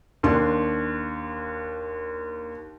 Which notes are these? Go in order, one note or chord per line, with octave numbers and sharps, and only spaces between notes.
D#2 D4 C6